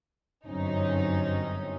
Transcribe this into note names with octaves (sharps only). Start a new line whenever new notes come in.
G1 F#2 C4 C#4 D#4